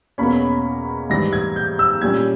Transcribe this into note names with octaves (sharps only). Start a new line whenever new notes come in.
E2 B2 A#3 C#4 B5
G#2 E3 G3 A#6
G#6
G6
E6
A#2 G3 C#4 G#6